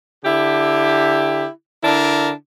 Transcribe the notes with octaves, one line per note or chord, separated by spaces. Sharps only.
D3 E4 G4
D3 D4 E4 A#4